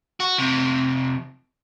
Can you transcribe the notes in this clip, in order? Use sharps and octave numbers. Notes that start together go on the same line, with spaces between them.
F#4
F2 C3